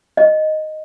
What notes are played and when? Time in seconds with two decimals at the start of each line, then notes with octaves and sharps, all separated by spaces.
0.17 D#5